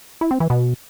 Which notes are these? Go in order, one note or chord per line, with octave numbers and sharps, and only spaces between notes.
E4
C4
E3
B2